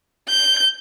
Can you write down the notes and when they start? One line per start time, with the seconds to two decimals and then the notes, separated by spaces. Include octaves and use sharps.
0.29 G6